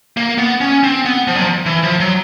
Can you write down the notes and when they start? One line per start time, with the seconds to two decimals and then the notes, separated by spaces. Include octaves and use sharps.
0.17 A#3
0.38 B3
0.61 C#4
0.83 C4
1.05 B3
1.27 F3
1.35 F#3
1.42 F3
1.66 E3
1.83 F3
2.00 F#3